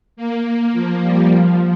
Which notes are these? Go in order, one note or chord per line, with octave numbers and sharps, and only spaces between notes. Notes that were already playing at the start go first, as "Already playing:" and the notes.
A#3
F3
G3
F3